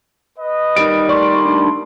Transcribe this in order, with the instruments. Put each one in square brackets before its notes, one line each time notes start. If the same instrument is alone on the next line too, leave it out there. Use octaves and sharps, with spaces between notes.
[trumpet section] B4 D#5
[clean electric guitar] D#3 G3 [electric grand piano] D7
[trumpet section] A3 C6 [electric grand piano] D5 [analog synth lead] C#6
[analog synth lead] D4